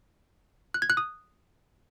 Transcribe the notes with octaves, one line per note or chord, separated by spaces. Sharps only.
F#6
G#6
F#6
D#6